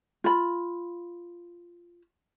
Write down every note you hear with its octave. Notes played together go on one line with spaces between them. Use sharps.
F4 B5